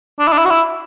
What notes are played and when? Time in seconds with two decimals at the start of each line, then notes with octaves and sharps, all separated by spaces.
0.19 D4
0.28 E4
0.33 D4
0.38 E4
0.45 F#4
0.50 E4